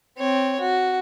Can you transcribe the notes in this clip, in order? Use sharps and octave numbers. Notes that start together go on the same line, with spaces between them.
C4 C#5
F#4